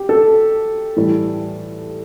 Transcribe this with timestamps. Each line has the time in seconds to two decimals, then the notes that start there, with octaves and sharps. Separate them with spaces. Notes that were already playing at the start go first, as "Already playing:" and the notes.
Already playing: G4
0.09 A4
0.97 A2 E3 G3